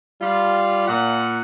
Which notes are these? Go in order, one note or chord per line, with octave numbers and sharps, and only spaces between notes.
G3 F4
A#2 F#5